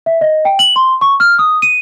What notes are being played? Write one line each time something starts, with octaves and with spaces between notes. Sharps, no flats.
E5
D#5
G5
F#7
C6
C#6
F6
D#6
D#7